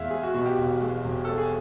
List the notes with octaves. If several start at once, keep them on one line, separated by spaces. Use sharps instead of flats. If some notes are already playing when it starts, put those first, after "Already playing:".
Already playing: E2 G#3 E5 F5
G#3 G#4
F#4
B2 F#4
G4
E1
G#3
E1
G#3 A4
G#4